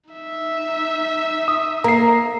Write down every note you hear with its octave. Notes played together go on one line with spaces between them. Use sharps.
D#4 E5
D#6
A#3 A#5 C7